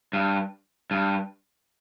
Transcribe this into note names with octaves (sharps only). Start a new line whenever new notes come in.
G2
G2